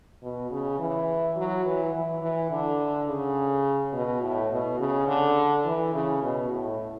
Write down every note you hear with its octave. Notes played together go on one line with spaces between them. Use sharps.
B2
C#3
E3
F#3
E3
E3
E3
D3
C#3
B2
A2
B2
C#3
D3
E3
C#3
B2
A2